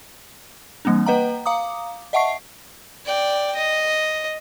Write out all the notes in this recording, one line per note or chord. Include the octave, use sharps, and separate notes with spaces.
E3 G3 A#3 C4 D4
A#3 B4 D#5 F#5 G5 A#5
F5 A#5 D6 D#6
D#5 E5 F#5 A5 C#6 C7
D5 G5
D#5